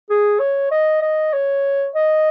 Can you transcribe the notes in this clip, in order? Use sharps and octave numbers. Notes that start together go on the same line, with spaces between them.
G#4
C#5
D#5
D#5
C#5
D#5